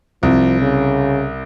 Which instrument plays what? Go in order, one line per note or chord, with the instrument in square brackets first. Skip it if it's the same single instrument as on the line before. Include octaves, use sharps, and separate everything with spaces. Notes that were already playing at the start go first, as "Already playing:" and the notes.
[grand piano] C2 [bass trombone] F3
[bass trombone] C#3